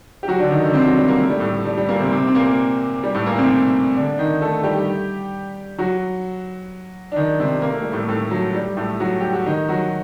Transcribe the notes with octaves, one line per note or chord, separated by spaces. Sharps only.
G4
F#3 F#4
D3 D4
D#3 D#4
D3 D4
C3 C4
F#3
G3
A#3
A3
G3
A2 A3
G3
G3
A#2 A#3
C3 C4
C3 C4
C4
A#2 A#3
G3
A2 A3
A#2 A#3
C3 C4
D3 D4
D#3 D#4
A3 A4
G3 G4
F#3 F#4
D4
D#3 D#4
C3 C4
A#3
A3
G3
A2 A3
A2 A3
F#3
G3
A2 A3
F#3 F#4
G4
F#4
D#3 D#4
F#3 F#4